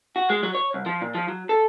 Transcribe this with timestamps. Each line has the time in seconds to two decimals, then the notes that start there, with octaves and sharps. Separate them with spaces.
0.16 F#4
0.30 G#3
0.43 F#3
0.55 C#5
0.74 C2
0.86 F3
1.02 A#2
1.14 F3
1.28 F#3
1.49 A4